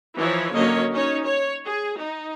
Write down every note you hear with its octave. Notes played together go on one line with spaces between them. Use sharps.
E3 F3 D#4 E4 C#5
D3 F#3 A#3 C#4 C#5 D#5
C#4 D#4 C#5
C#5
G#4
D#4